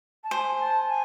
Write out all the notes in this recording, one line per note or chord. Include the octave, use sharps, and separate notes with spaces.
A5
C5 G#5
A5
G#5